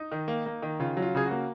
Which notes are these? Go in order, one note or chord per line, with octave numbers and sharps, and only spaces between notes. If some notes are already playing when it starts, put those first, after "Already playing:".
Already playing: D#4
D#3
A#3
A#3
D#3
C#3 F4
F#3
F4
C#3 G#4
A#3 F#4